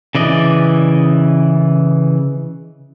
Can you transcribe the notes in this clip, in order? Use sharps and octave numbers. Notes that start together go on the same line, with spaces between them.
C#3 E3 D5 D#5